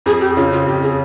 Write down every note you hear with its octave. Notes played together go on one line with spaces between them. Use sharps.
F2 G#4
G4
C#3 F4
F4
F2 G4
G#4